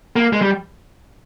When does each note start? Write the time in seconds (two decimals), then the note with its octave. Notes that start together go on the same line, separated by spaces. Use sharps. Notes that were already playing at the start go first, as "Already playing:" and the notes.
0.16 A#3
0.33 G#3
0.42 G3